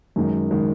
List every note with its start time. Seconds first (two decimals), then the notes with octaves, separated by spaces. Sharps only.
0.16 F#2 D#3 G#3
0.51 D#3 G#3